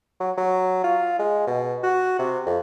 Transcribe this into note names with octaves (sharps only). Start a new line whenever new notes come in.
F#3
F#3
F4
G#3
B2
F#4
C3
F2